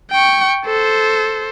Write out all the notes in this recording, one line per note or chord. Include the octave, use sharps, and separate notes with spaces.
G5 C#6
A4 C5